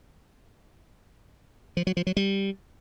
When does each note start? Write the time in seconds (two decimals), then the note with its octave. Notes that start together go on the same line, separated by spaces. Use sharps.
1.77 F3
1.87 F#3
1.97 F3
2.07 F#3
2.17 G3